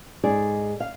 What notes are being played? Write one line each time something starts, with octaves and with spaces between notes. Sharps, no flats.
G#2 D#4 G#4 D5
F5